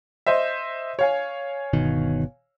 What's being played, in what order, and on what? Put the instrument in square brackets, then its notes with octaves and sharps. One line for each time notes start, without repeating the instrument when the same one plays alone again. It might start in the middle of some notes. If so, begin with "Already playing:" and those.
[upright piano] C5 D#5 E5
C#5 F5 G#5
[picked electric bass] G1 B2 D#3